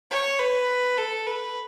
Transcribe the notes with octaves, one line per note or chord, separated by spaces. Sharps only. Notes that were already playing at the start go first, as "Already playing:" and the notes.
C#5
B4
A4
B4